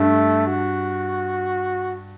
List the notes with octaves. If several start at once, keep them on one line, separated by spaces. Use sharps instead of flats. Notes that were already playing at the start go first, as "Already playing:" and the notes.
Already playing: G2 A3
F#4